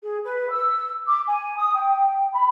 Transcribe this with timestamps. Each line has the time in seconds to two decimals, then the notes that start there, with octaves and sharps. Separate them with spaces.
0.03 G#4
0.23 B4
0.50 E6
1.05 D6
1.26 G#5
1.58 D#6
1.74 G5
2.32 B5